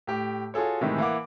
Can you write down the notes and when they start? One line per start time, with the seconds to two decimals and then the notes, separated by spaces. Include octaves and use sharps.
0.07 A2 G4
0.54 F4 F#4 G#4 A4 C#5
0.81 A2 C3 D#3 E3 G#3
0.98 E3 A#3 F5 F#5 D6